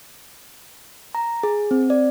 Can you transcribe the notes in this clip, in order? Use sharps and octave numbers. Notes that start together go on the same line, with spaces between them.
A#5
G#4
C4
D5